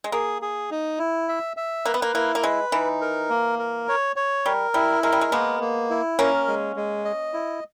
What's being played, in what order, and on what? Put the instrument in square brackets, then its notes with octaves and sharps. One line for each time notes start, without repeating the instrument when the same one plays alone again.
[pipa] G#3
[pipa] A#3 [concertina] G#4
[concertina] G#4
D#4
E4
E5
E5
[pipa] A#3 [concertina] B4
[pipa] B3
A#3
[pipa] A#3 [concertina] E4
[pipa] A#3
[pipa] G#3 [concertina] B4
[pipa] E3 [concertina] D#4
[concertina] A#4
A#3
A#4
C#5
C#5
[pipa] G3 [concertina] A#4
[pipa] G3 [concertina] E4
[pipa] G#3 [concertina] A#4
[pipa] G3
G#3
[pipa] G#3 B3 [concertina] A#3
[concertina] A#3
E4
[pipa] A#3 C#4 [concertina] A#4
[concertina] G#3
G#3
D#5
E4